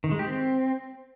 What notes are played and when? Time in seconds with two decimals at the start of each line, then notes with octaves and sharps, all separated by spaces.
0.04 D#3
0.12 G#3
0.19 G4
0.27 C4